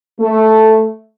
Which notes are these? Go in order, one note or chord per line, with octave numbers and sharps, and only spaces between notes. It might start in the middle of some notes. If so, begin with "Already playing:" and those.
A3